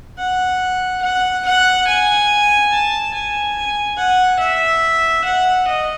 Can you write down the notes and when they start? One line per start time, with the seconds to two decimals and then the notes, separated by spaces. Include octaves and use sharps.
0.18 F#5
1.02 F#5
1.45 F#5
1.87 G#5
2.71 A5
3.14 G#5
3.97 F#5
4.39 E5
5.24 F#5
5.67 D#5